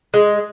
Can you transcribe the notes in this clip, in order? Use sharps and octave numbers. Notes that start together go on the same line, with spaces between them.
G#3